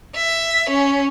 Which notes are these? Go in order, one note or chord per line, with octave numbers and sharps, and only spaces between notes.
E5
C#4